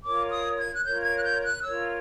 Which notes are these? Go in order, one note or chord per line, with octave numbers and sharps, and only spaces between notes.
F4 A#4 C#5 D6
D#6
G#6
F#6
F4 A#4 C#5 G6
G#6
F#6
G6
F#6
F4 A#4 C#5 E6